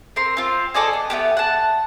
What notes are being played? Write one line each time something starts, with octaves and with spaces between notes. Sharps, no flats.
C4 A#4 C6
C4 F4
A4 D5 D#5 G#5
B3
A3 B3 G4
F#5 A5